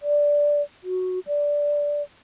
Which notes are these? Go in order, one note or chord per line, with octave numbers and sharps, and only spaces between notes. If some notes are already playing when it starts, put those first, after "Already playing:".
D5
F#4
D5